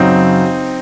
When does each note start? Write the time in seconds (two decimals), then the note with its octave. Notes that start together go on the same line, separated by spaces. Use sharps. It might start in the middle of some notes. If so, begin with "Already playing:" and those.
Already playing: F#2 C#3 F#3 C4 D#4